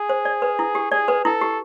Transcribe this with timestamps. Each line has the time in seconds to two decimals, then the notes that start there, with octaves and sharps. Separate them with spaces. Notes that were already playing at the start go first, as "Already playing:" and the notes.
Already playing: G#4
0.09 C5
0.25 D5
0.42 B4
0.59 E4
0.75 G4
0.91 G#4 D5
1.08 B4
1.25 E4 A4
1.41 G4